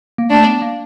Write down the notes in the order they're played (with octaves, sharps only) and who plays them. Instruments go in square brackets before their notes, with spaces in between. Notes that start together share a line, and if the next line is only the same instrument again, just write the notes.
[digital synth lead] A#3
[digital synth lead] A3 [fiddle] D4
[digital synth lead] B3
A#3